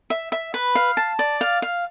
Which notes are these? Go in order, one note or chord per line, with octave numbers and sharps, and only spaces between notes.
E5
E5
B4
F5
A5
D5
F5
F5